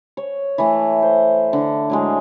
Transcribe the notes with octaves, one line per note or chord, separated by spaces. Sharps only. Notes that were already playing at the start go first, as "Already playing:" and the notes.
C#5
E3 A3
C5
D3
A2 F#3 G#3